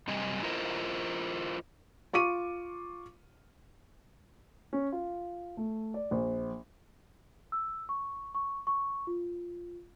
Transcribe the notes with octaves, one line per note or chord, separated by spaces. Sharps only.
F#2 C3 G3 D#5 G#5
E4 F4 A#4 C5 D#5
F4 C#6 D6 D#7
C#4
F4
A3
D5
A#1
E6
C#6
C#6
C#6
F4